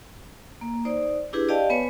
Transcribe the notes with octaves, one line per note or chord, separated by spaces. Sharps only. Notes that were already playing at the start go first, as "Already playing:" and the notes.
A#3
D#4 C5 D5
D4 E4 G4 G#4 B4
G4 D5 D#5 F5 G5 A5
B3 B4 C#5 G#5